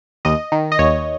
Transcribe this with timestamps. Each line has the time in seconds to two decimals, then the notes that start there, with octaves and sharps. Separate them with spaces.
0.25 D#2 D#5
0.52 D#3
0.72 D#5
0.79 D#2 C#5